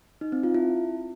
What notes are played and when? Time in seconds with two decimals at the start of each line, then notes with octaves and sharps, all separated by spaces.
0.21 D#4
0.32 C4
0.43 F4
0.54 E4